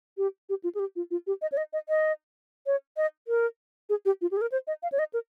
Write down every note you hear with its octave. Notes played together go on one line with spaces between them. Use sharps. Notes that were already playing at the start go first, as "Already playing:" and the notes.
G4
G4
F4
G#4
G4
F4
F4
G4
D#5
C#5
D#5
D#5
D#5
C#5
D#5
A#4
G#4
G4
F4
G4
G#4
A#4
C5
D#5
F5
C#5
D#5
A#4